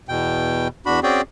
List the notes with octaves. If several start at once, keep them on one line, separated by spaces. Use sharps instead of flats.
E2 B2 G5
E2 D4 F#4 B5
C4 C#4 F#4 G#4 D5 G5